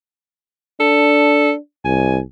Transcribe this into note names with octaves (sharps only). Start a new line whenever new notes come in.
D4 A4
C2 G#5